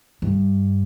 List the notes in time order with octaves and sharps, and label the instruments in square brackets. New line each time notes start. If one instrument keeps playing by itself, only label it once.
[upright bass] G2